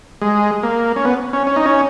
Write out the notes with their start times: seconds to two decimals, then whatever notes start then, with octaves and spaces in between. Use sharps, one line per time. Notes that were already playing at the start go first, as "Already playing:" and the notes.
0.21 G#3
0.63 A#3
0.96 C#4
1.05 B3
1.33 C#4
1.47 C#4
1.56 D#4
1.66 C#4